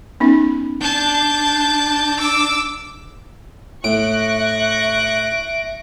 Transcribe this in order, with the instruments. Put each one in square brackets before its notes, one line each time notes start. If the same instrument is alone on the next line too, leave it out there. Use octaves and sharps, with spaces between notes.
[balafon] B3 C#4 D#4
[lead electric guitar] D4 [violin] A5 G6
[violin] D6 E6
[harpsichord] A2 [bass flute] E5 [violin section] C#6 F#6 A#6 [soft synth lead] D7